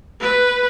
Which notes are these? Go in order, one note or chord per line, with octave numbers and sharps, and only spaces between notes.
B4